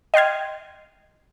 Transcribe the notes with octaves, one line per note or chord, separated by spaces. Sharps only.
D#5 G5 C6 F6 G#6